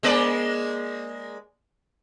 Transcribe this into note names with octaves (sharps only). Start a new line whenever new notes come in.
G#3 A#3 D5